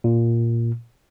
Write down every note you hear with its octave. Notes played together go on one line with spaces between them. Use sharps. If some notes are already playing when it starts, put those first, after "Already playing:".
A#2